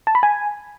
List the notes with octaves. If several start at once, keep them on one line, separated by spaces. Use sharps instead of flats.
A5
B5
G#5